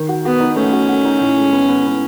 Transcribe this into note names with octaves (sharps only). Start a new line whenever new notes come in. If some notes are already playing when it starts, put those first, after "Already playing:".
Already playing: D#3
F#4
B3 F#4
D#4
A3 C#4
F#4
F#4
D#4
A2
G#3
B3
B3
B3